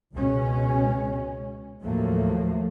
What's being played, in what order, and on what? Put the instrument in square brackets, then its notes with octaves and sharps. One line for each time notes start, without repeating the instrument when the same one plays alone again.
[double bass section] C#2 B2 G#3 C#4
D#2 A2 F3 F#3 A3 A#3